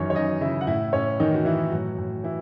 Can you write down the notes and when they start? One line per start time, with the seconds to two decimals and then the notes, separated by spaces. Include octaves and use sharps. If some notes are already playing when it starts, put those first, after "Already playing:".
Already playing: F#2 D#3 E3 C#4 D#4 C#5
0.10 C#5
0.15 F#2 D#4 D#5
0.41 C#3 E4 E5
0.61 F#5
0.67 A2 E4 E5
0.93 A2 C#4 C#5
1.20 D#3 E3 D#4
1.34 F#4
1.45 E3 E4
1.71 A2 F#3 F#4
1.98 A2
2.24 E3 E4